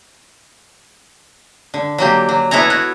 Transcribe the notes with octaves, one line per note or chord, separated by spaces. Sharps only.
D3
F#3 A#3 G4
F#3
B3 E4 A4 C#5 A#5
F#4